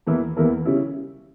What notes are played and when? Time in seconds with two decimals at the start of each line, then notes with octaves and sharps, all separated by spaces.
0.07 E2 E3 A#3 E4 A#4
0.37 E2 E3 A#3 E4 A#4
0.65 C#3 G3 C#4 E4